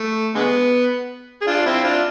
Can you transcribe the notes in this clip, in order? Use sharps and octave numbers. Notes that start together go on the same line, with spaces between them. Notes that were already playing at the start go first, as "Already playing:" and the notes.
Already playing: A3
D3 G#3 B3
G#4
D4 F4
C4 E4
D4 F4